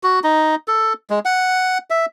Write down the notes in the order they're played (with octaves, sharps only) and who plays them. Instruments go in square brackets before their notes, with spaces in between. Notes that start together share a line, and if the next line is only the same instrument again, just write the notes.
[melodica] F#4
D#4
A4
G#3
F#5
E5